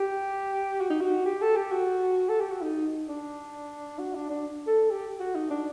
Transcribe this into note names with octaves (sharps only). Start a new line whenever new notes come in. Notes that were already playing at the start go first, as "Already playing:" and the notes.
Already playing: G4
F#4
D#4
F#4
G4
A4
G4
F#4
A4
G4
F#4
D#4
D4
F#4
D4
D4
A4
G4
F#4
D#4
D4